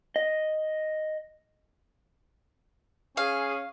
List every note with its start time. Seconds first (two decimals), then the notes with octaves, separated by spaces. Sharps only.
0.16 D#5
3.17 C#4 G#4 F5